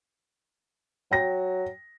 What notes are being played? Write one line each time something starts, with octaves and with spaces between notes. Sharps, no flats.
F#3 G5 A#6